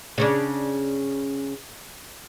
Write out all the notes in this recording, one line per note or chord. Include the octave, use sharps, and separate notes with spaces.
C#3 C#4 D4